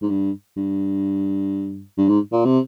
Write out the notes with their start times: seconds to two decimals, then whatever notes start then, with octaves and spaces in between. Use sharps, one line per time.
0.02 G#2
0.10 G2
0.57 G2
1.98 G2
2.09 G#2
2.32 A#2
2.45 C3